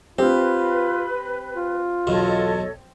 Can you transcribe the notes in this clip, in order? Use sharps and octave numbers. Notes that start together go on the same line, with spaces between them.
C4 F4 G4 B4
F4
B1 E2 B2 A4 C#5 D#5